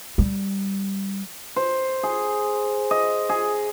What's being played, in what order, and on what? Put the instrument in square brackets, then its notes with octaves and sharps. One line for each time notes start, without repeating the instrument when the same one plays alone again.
[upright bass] G3
[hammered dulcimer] C5
G#4
D#5
G#4